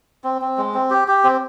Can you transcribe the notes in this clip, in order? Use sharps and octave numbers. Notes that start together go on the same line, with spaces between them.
C4
C4
G#3
C4
G4
G4
C4